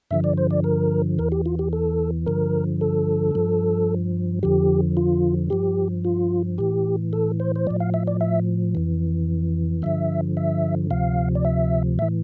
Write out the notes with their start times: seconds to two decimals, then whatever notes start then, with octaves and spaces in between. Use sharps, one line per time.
0.11 G2 D3 F3 E5
0.24 D5
0.37 C5
0.51 D5
0.64 A#4
1.18 E2 E3 A#4
1.32 G4
1.46 F4
1.59 G4
1.73 A4
2.26 G2 D3 F3 A#4
2.81 A4
3.35 G2 F3
4.43 F2 D3 F3 G4
4.97 F4
5.50 G2 F3 G4
6.05 F4
6.58 A2 E3 G4
7.13 A4
7.40 C5
7.56 C5
7.67 A2 F3 D5
7.80 F5
7.94 E5
8.07 D5
8.21 E5
8.75 F2 E3
9.82 G2 D3 F3 E5
10.37 E5
10.91 D2 C3 F3 F5
11.35 D5
11.45 E5
11.99 A2 E3 E5